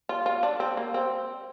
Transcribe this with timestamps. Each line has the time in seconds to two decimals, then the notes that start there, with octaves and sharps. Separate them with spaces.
0.09 F4
0.26 F4
0.43 D4
0.60 C4
0.77 A#3
0.94 C4